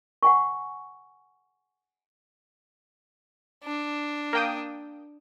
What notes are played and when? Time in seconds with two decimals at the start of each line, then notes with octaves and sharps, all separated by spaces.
0.23 F#5 G#5 C#6
3.64 D4
4.33 A#3 G5 D#6